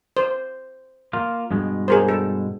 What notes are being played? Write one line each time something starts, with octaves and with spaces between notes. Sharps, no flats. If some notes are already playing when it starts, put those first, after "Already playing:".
C5
A#3 F4
G2 B2 G#3
G#4 A#4 C5
A4